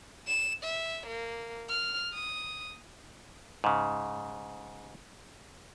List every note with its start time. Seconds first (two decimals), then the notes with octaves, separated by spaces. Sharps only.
0.27 E7
0.64 E5
1.07 A#3
1.69 F6
2.13 D#6
3.64 G#2 C#3